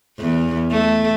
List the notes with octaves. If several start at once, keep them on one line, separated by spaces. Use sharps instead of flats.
E2
A3